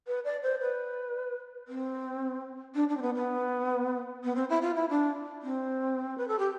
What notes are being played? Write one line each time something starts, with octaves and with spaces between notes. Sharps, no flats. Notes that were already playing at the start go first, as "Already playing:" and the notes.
B4
D5
C5
B4
C4
D4
D4
C4
B3
B3
B3
C4
E4
F4
E4
D4
C4
B4
A4
G4